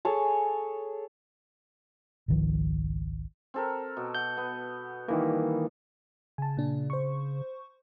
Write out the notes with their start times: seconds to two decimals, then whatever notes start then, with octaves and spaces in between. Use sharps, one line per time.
0.05 G#4 A4 C#5 A5
2.28 G#1 C#2 D#3 F3
3.54 C4 A4 A#4
3.97 B2
4.15 F#5 G6
4.37 B3
5.08 D#3 E3 G3 A#3
6.38 C#3 G#5 A5
6.57 A#2 D4
6.90 C5 C#6